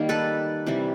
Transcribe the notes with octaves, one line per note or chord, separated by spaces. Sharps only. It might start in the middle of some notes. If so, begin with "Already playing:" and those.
Already playing: D#3 G3 A#3
A4 B4
C3 E3 G3